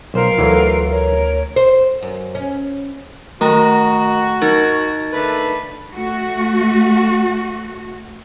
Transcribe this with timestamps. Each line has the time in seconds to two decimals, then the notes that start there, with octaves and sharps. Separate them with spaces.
0.14 B1 F4 A#4 C5 F5
0.38 D2 E3 F#3 A4
0.90 A#4 C#5
1.56 C5
2.02 F#2
2.35 C#4
3.41 D#3 A3 F#4 A#5
4.42 D#4 A#4 A6
5.13 D3 A3 B4
5.93 A3 F#4